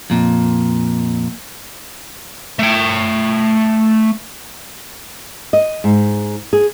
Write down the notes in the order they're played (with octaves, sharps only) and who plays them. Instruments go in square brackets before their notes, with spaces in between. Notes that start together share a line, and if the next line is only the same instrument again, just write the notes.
[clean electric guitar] F2 A#2
[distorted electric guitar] A3 G5
[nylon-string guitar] D#5
G#2
G#4